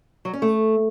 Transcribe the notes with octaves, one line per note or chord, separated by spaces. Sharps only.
F#3
C#4
A3